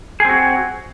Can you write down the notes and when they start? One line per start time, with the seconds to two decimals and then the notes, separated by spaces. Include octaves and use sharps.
0.20 G#4
0.25 C4
0.29 F#4